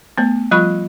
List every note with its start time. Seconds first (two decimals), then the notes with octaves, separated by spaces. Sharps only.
0.18 A3 B3
0.51 F3 G3 F4 B5 C#6